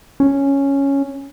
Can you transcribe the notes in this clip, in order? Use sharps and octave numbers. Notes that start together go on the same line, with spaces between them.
C#4